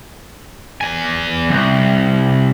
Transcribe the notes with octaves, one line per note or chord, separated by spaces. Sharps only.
E2 G#5
C2